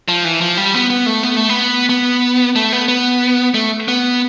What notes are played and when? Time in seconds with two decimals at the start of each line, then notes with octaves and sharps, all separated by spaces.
0.08 F3
0.25 E3
0.41 F3
0.57 G3
0.74 B3
0.90 B3
1.06 A3
1.23 B3
1.37 A3
1.49 B3
1.90 B3
2.56 A3
2.72 B3
2.88 B3
3.54 A3
3.88 B3